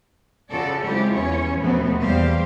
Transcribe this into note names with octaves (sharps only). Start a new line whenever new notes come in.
C#3 F4 F#4 A4 D5
F#3 G#3 C4 E4 F4 G4
E2 E3 C#4 C#5
D#2 B2 F3 A3 B3 C4
E2 G3 G4 C5 F5